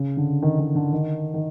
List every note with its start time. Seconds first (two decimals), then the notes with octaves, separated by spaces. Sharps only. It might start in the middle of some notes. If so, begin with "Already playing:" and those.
Already playing: C#3
0.17 D3
0.42 D#3
0.59 D#3
0.75 D3
0.93 D#3
1.34 D#3